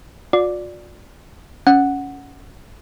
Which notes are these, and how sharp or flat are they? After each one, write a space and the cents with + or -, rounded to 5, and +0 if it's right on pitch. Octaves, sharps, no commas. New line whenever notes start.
F4 +45 D5 +0
C#4 +10 F#5 +0